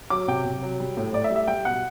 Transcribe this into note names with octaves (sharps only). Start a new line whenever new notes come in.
F#3 D6
C3 G5
C3
F#3
G3
A2
A2 D5
E5
G3
E5
G3 G5
B2 F#5